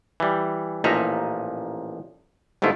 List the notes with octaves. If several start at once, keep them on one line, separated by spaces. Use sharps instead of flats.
E3 G3
A1 A#2 F3 D#4 E5 A#5
G1 G#2 A3 E4 F4